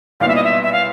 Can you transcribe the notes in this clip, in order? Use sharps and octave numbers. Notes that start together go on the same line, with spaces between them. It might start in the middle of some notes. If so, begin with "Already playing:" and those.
B1 A#2 G3 B3 E4 F5
E5
D#5
E5
E5
F5